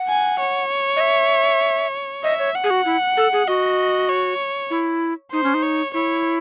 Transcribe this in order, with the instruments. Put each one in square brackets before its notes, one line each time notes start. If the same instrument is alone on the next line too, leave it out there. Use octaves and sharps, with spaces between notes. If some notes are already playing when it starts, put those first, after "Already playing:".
Already playing: [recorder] F#5
[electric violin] G#5
C#5
[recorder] D#5
E5
[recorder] D#5 [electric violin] E5
[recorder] C#5
[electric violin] F#5
[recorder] G#4
F#4
E4
A4
G#4
[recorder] F#4 [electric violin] D#5
[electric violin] C#5
[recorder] E4
[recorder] D#4 [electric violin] C5
[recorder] C#4
D#4
[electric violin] C#5
[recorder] E4 [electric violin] C#5